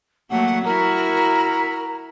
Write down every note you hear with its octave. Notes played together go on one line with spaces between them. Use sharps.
F#3 A3 A#3 F#5
E4 F#4 A#4 A#5